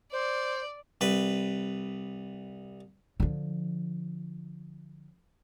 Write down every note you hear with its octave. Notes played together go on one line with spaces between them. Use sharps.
C5 D5
C2 B4
D3 F3